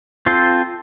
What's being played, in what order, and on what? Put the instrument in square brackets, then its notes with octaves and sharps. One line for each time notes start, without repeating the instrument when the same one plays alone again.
[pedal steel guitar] C4 F4 A4 C5